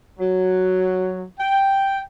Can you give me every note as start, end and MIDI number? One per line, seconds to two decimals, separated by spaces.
0.19 1.22 54
1.38 1.99 79